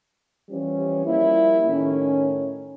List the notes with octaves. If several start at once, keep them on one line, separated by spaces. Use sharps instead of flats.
E3 F3 G3 C#4
F3 G3 A#3 E4
A2 D#3 C#4